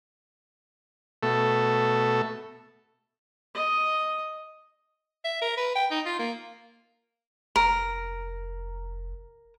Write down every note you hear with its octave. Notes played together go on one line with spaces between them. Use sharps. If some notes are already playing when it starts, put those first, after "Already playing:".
B2 A3 A4
D#5
E5
A#4
B4
G5
D#4
F4
A#3
F1 A#4